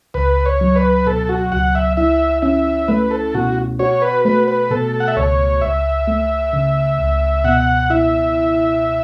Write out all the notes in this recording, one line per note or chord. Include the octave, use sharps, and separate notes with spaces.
C#2 B4
C#5
F#3
B4
B2 A4
F#4
C#2 F#5
E5
E4 E5
C#4 E5
A3 B4
A4
B2 F#4
F#4 C#5
B4
A3 B4
B4
B2 A4
F#5
E5
C#2 C#5
C#2 E5
A3
C#3
C#2
B2 F#5
E4 E5